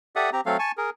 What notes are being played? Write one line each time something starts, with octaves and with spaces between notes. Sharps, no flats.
G4 A4 D5 E5 F#5 D#6
C4 G4 A#5
F#3 A3 C4 A4 F5
G#5 A5 C#6
G#4 A#4